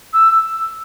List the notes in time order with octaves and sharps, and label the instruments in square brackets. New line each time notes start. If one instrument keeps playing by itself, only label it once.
[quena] E6